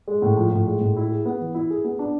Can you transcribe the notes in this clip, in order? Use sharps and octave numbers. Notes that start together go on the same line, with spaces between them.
G#3
A2
F3
A2
G#3
A2
E4
G#4
B3
E3
E4
G#4
B3
D4